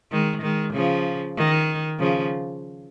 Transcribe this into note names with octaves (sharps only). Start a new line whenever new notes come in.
D#3 G#3
D#3 G#3
C#3 F3
D#3
C#3 F3